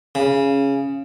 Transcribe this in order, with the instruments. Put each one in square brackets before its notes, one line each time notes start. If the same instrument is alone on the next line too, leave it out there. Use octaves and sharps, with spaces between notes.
[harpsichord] C#3